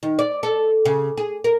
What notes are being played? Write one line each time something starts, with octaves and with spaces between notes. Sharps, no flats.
D#3
D5
A4
C#3
G#4
A#4